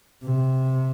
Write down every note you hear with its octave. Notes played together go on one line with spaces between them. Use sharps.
C3